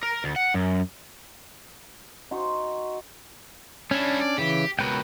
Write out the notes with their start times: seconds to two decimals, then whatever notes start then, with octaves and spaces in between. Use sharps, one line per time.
0.03 A#4
0.24 D2
0.36 F#5
0.54 F#2
2.31 D#4 F#4 C6 C#6
3.91 G3 C#4 D4 E4
4.21 D5
4.38 C#3 E3 G4
4.79 C#2 B2 A#4 B4 G5